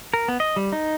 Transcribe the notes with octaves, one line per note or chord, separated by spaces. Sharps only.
A#4
B3
D#5
G3
D#4